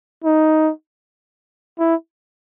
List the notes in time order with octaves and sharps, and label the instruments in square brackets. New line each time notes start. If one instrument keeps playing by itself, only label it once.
[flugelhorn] D#4
E4